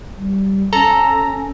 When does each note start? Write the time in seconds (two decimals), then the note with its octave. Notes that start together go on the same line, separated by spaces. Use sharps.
0.16 G3
0.73 C#4 A4 A#5